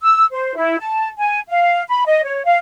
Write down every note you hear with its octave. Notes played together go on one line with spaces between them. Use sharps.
E6
C5
E4
A5
G#5
F5
B5
D#5
C#5
F5